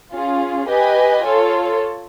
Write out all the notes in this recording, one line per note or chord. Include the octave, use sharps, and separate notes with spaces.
C#4 F4 G#4
G4 B4 D#5 G#5
F4 A4 C#5